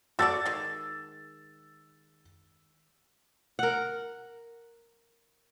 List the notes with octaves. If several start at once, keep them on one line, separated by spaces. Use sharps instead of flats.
F#4 A4 D5 E6 A6
D#3 G#3
A#4 F#5